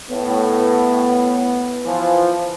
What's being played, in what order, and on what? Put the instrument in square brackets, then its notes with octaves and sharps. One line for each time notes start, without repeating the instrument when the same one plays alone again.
[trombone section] A2 [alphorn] B3
[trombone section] E3 F3